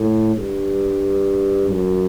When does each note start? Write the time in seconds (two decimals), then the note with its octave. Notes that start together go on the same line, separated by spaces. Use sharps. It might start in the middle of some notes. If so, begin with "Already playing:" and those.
Already playing: A2
0.36 G2
1.70 F#2